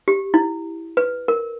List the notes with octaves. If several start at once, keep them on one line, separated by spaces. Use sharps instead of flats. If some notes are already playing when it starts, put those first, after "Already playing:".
G4
E4
B4
A#4